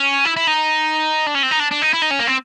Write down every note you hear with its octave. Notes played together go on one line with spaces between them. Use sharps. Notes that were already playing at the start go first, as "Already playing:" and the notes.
Already playing: C#4
E4
E4
D#4
D4
C#4
C4
D#4
D4
D4
D#4
E4
D#4
C#4
A#3
C4